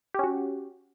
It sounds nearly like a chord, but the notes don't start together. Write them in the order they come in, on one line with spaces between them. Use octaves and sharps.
G4 C#4 F#4